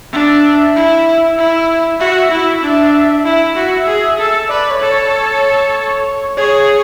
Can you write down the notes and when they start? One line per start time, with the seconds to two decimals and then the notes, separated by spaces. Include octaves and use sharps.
0.12 D4 E5
0.75 E4
1.38 E4
2.00 F#4 E5
2.31 E4
2.63 D4
3.25 E4 E5
3.56 F#4
3.87 G#4
4.19 A4
4.49 B4 D5
4.70 C#5
4.81 A4
4.91 C#5
6.37 G#4 C#5